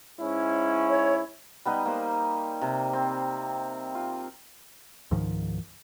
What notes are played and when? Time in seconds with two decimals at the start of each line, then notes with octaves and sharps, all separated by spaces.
0.20 G#2 C#4 E4
0.90 C#5
1.66 G3 B3 D#4
1.85 A#3 C5
2.61 C3
2.93 C4
3.95 F4
5.11 C#2 G#2 D#3 F3